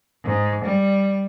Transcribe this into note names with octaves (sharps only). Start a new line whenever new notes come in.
G#2
G3